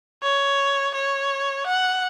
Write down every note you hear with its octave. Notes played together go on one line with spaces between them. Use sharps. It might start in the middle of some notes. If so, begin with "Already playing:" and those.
C#5
C#5
F#5